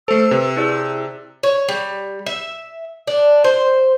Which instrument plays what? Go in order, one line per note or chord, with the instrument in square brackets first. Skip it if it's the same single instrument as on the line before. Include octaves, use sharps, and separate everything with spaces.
[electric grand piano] A3 A4 [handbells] C5 C7 [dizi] E6
[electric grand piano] C3 [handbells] B4
[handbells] E4 G#4 D5
[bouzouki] C#5
G3
E5
D4
C5